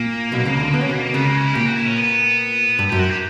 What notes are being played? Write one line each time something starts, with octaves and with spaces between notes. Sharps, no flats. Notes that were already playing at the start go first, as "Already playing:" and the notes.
Already playing: A#2 A#3
B1 B2
C#2 C#3
D2 D3
B3
C#4
B2 B3
C#2 C#3 B3
A#3
C#4
E4
A#2 G4
F#4
E4
C#4
B3
G2
F#2 G4
F#4
G4